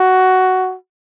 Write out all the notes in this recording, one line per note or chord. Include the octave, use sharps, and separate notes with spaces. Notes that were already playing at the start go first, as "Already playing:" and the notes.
Already playing: F#4